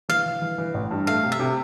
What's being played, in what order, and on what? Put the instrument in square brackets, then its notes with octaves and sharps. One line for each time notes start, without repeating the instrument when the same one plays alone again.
[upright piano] E3 [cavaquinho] F5
[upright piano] E3
E3
E3
A1
G2
[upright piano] A3 [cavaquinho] F5
[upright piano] C3
[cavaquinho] E5
[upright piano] C3